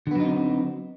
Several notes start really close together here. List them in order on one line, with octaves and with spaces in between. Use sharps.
D3 B3 F#3 D#4 C4